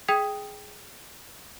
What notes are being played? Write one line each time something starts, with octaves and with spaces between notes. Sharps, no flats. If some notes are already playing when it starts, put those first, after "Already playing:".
G#4 G5 D#6 G#6 B6 F7